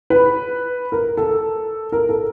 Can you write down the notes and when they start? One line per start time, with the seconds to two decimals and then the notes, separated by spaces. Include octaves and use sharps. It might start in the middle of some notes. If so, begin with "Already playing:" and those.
0.10 B4
0.92 A#4
1.17 A4
1.92 A#4
2.09 A4